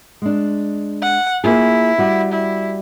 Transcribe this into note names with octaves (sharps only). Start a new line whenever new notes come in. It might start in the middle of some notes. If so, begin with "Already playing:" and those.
G#3 D4
F#5
A#3 E4 F4 G#4
G3 F#4
E4